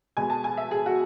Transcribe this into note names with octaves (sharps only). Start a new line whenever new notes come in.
B2 G#3 G#5
A5
G#5
E5
G#4
F#4